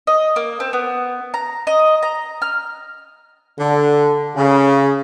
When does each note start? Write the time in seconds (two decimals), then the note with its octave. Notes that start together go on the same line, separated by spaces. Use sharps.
0.07 D#5
0.36 A#3
0.60 C4
0.73 B3
1.34 A#5
1.67 D#5
2.03 A#5
2.42 F6
3.59 D3
4.36 C#3